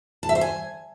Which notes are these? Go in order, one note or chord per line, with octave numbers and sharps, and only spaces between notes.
A5
E5
C5
G#5